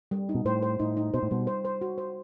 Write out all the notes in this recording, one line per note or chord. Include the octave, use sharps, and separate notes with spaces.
G3
D#4
B2
A2 C5
C5
A2 D#4
D#4
B2 C5
A2
B2 G3
C5
C5
F#4
C5